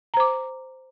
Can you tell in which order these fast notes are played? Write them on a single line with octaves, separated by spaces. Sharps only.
A#5 C5 D6